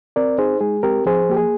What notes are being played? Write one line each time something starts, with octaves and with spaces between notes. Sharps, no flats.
C4 A#4 D5
D#4 G#4 C5
G#3 G#4
C4 G4 A#4
F3 G#4 C5
A#3 G4
G#4